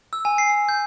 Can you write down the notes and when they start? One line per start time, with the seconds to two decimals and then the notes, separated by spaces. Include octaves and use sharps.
0.13 E6
0.25 G#5
0.38 C7
0.50 C7
0.69 G6